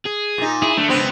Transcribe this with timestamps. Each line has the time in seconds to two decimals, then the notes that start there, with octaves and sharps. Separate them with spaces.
0.06 G#4
0.38 A#2 D#4
0.62 E4 G#4
0.77 D3 A3
0.90 C#2 B3 C4